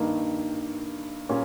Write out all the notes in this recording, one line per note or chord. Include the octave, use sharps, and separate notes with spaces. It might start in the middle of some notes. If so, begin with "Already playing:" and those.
Already playing: G2 D#3 A#3
A#2 G3 A#3 C#4